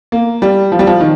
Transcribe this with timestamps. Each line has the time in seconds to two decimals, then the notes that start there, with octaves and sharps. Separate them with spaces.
0.12 A#3
0.42 G3
0.72 F3
0.79 G3
0.87 F3
1.00 D#3